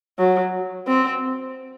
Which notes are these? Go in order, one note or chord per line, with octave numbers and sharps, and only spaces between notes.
F#3
C4